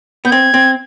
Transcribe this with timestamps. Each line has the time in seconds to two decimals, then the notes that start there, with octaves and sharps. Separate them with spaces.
0.25 B3 G6
0.31 C4 G#6
0.54 C4